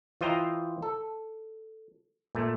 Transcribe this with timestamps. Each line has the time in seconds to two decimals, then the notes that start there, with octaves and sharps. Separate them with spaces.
0.21 E3 F4 C5 D#5 G5 A#5
0.82 A4
2.35 A#2 A3